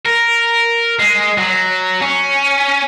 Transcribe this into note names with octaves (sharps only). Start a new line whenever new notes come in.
A#4
G#3
F#3
C#4